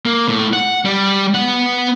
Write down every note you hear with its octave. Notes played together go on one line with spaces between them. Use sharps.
A#3
A2
F#5
G3
B3 F#5